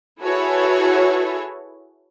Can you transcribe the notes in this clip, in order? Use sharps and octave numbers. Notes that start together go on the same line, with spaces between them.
E4 F#4 G#4 A4 B4 C#5